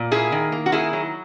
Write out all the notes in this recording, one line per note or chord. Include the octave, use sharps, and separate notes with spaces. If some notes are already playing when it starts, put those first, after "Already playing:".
Already playing: A#2
A#3 E4 G#4
D#3
A#3
F#4
D#3 E4 G#4
F#3